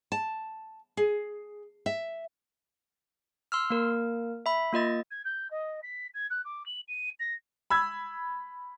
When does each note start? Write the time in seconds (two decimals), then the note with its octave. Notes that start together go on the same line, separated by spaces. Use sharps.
0.12 A5
0.97 G#4
1.86 E5
3.52 C6 E6 F6
3.70 A#3 A#4
4.46 E5 B5
4.73 A#3 F4 D#5 A6
5.11 G#6
5.25 G6
5.51 D#5
5.83 B6
6.14 G#6
6.30 F#6
6.45 D6
6.66 F#7
6.88 D#7
7.20 A#6
7.70 B5 E6 G#6